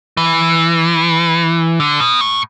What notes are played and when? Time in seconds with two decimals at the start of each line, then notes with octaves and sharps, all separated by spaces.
0.17 E3
1.80 D3
2.00 B2
2.21 A2